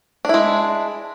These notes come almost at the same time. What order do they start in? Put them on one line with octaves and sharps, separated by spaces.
D4 E4 G#3